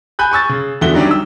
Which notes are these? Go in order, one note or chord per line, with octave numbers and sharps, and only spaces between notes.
G#5 B5 F#6 G6
G#5 C#6 E6 A6
C#3
E2 D3 F#4 E5 G7
D#3 F#3 G3 C#4 D4
E6